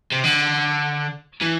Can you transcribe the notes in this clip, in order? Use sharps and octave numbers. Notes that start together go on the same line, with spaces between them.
C3
D3
E3